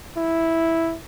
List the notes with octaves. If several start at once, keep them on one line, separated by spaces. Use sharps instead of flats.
E4